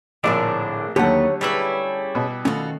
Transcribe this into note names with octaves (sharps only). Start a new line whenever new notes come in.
A#1 A2 D3 C4 D4 G#4 A#4
D#2 D3 F#3 A3 B3 G4 C#5 F#5
G3 C#4 E4 G#4 B4
B2
D#3 A3 C#4 F4 F#4